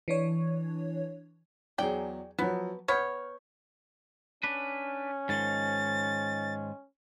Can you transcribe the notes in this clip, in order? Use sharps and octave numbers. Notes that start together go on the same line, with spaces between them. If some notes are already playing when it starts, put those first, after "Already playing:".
E3 D4 C#5
E2 F#3 G#4 D5 G5
F3 F#3 B3
B3 C#5 F6 G6
C#4 D4 B4
G#2 D#3 F3 A6